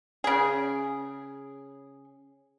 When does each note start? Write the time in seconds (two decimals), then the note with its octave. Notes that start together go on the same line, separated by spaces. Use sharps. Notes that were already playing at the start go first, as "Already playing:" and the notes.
0.24 C#3 G#4